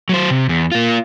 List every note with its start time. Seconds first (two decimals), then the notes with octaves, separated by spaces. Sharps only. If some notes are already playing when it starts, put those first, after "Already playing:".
0.09 F#3 C5
0.30 C3
0.49 E2
0.72 A#3 F4